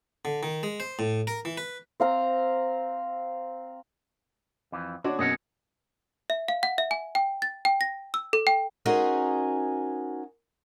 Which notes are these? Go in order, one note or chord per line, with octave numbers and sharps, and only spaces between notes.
D3
D#3
G#3
C5
A2
A#4
E3
B4
C4 F5 A#5
F2 E3
D3 D4 F#4 C#5
F#2 B2 G#4 D#5 F#5
E5
F5
F#5
E5
G#5
G5
A6
G5
A#6
E6
A4
G5
C#4 D#4 F#4 G#4 A#4 C5